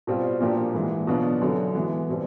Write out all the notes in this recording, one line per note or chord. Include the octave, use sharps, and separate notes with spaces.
B2 G3 C4 F4
A#2 F3 A#3 D4 G4
G#2 E3 G#3
B2 F#3 B3 D4 F4
F#2 D3 F#3
E3 G#3 B3
B2 G3 C4